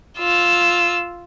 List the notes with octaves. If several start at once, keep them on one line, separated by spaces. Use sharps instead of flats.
F4 E6